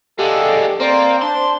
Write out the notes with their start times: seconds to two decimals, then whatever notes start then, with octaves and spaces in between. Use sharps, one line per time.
0.19 D3 G#3 G4 A4 F5
0.80 A#3 C4 C5 D5
1.22 D4 A5 C6